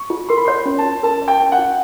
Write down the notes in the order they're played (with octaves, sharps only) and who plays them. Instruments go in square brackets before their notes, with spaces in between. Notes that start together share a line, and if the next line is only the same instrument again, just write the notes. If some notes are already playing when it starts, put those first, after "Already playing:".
Already playing: [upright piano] C#6
[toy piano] F4
[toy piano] A#4 [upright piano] C6
[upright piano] B5
[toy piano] C#5 [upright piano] C6
[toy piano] C#4
[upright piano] A5
[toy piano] F4
[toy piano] A#4 [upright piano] A5
[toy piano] C#5
[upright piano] G5
[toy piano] C#4
[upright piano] F#5
[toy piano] F4